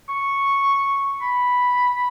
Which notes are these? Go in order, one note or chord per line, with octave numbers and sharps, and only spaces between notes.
C#6
B5